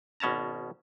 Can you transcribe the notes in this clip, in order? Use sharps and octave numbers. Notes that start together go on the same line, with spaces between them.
G#1 B2 C#4 A5 A#5